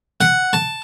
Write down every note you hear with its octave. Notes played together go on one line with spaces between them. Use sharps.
F#5
A5